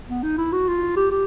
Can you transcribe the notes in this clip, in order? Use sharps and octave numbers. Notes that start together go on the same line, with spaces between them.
B3
D#4
E4
F#4
F4
G4
G4